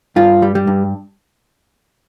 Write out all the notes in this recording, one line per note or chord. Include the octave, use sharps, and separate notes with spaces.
G2 F4
G3
G3
G2